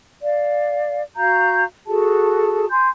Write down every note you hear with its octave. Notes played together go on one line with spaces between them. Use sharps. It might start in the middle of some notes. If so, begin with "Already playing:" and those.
D5 F5
F#4 F5 A#5 G6
F#4 G#4 A4 A5
G#5 C6 G6